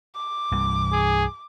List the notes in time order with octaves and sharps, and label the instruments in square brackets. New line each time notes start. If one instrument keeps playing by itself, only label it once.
[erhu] D6
[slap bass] C2 G2 E3
[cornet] G#4